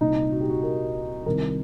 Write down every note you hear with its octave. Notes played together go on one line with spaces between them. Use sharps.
C2 A#2 D#4
F#4
G4
F#4
A#4
C2 C3 D#3 A#4